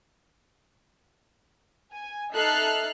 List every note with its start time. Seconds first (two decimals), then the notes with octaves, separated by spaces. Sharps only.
1.92 G#5
2.33 D#4 A4 E5 F6 F#6 C7